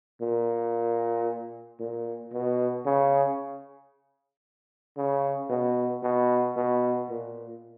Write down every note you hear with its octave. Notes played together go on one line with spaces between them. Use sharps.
A#2
A#2
B2
C#3
C#3
B2
B2
B2
A#2